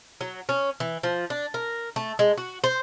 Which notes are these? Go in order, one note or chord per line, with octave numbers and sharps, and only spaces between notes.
F#3
C#4
E3
F3
D4
A#4
A3
G#3
F#4
C5